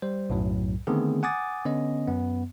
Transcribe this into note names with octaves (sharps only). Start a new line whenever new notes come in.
G3 C5
B1 F#2 A2 F#3
D3 D#3 A3 B3 C4 G#4
F#5 G#5 D6 D#6 A6
D3 B3 C#4 D#5
F#2 B3